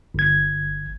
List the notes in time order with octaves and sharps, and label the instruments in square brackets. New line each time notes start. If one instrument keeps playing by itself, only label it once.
[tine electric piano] G1 G#6